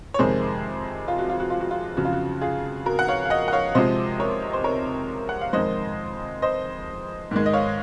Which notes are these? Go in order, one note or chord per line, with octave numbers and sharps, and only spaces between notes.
C#5
F2 C3 D#3 G#3 G#4 C5
F4
F#4
F4
F#4
F4
F#4
F4
F2 C#3 F#3 F#4
F4
F#4
F4 G#4
F#4 A#4
F#5
C#5 F5
F5
D#5 F#5
F#5
C#5 F5
C3 F3 G#3 C5 D#5
A#4 C#5
C5
A#4 C#5
F#5
F5
F2 D#3 G#3 C5 D#5
C5 D#5
G#2 D#3 G#3
D#5
C#5 F5